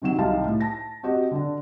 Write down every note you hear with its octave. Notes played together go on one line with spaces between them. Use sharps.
C3 D#3 F#3 E7
C2 D#4 F5 A5
A2
A5 A#6
C4 F#4 G4 D#5
D3 D4